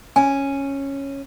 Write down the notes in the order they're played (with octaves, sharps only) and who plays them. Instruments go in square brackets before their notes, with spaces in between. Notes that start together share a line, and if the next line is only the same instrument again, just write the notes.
[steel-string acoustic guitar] C#4 [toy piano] G#5